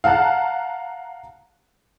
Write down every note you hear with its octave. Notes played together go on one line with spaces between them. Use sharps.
F5 F#5 A5 A#5 F#6